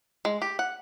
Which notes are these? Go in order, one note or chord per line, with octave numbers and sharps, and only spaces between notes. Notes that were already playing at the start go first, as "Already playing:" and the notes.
G#3
G4
F#5